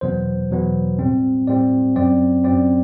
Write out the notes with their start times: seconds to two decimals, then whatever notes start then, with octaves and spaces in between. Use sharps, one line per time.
0.01 E2 B2 F#3 B3 C5
0.50 E2 B2 F#3 B3
0.98 A2 G3 C4
1.47 A2 G3 C4 D5
1.96 F#2 F#3 C4 D5
2.44 F#2 F#3 C4 D5